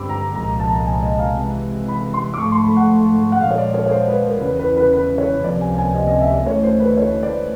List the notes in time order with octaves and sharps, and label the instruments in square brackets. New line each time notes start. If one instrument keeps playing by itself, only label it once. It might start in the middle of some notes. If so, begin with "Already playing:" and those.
Already playing: [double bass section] G2 D3 G3 C4 [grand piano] B5 D6 E6
[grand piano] A#5
[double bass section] C2 A#2 F3 G#3 [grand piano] A#5
[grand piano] A5
G#5
D#5
F5
[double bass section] C3 E3 G#3
[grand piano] B5
C6
D6
[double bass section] G#2 F3 A3 [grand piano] C#6
[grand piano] C6
B5
F#5
F#5
[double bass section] A#2 F3 G#3 [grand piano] F5
[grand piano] C#5
D5
C#5
C#5
C5
B4
A#4
[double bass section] E2 C#3 E3 [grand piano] B4
[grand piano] B4
B4
B4
C#5
[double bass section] C#2 C3 F3 A#3 [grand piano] D5
[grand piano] G#5
G#5
D#5
D#5
E5
D5
[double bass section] D2 C#3 E3 A3 [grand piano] C#5
[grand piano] C5
B4
C#5
D5